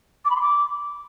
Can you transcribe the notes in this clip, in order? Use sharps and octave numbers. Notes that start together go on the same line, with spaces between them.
D6
B5
C6
D6